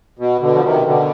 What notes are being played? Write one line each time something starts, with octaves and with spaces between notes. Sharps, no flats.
B2
B2 D3
F3
C3 D#3
B2 D3